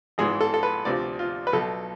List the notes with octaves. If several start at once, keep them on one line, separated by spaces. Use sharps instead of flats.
G#1 G#2 E3 G#4
A4
A4
B4
D2 C3 F3 D5
F4
B4
B1 B2 A4